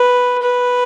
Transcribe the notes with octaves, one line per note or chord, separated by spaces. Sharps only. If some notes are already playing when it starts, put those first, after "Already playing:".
Already playing: B4
B4